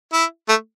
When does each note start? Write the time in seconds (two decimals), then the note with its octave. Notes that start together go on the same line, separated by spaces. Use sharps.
0.13 E4
0.49 A3